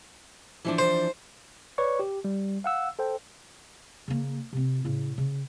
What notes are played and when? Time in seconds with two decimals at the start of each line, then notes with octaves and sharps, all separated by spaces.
0.65 E3 F3 D4
0.79 C5
1.78 B4 C#5 D5 C#6
1.99 G4
2.24 G3
2.64 F5 F#5 E6
2.99 A4 C5 G5
4.08 C#3 A#3
4.53 C3 C4
4.85 A2 C#3
5.18 C#3